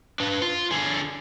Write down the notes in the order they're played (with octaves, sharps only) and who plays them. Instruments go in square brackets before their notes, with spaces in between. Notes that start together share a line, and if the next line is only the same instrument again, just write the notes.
[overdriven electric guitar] D4 B4
F4 C6
D3 G#4